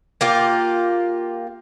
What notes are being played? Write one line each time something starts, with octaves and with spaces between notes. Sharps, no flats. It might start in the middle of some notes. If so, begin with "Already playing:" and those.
A#3 F4 G4